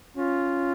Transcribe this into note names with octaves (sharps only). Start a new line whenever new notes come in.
C#4 F4